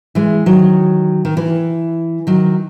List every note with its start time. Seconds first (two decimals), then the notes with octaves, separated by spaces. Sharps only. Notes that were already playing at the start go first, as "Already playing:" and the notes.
0.15 E3 G#3
0.46 D#3 F#3
1.25 D#3
1.37 E3
2.27 D#3 F#3